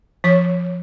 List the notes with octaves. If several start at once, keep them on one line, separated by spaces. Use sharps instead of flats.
F3 C#5 C#6